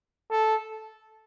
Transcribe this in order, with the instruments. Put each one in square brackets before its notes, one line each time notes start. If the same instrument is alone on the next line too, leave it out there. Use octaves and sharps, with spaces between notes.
[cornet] A4